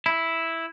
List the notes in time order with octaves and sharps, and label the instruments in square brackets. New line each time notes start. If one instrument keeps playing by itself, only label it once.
[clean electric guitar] E4